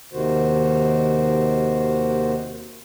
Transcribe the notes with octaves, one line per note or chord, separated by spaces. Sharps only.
D#2 C3 D#3 F#4 C5